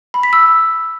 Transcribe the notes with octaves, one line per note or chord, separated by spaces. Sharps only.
B5
B6
E6